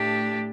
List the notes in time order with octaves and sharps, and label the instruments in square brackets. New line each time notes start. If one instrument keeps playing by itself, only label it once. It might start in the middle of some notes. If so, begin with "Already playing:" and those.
Already playing: [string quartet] A2 A3 D4 G4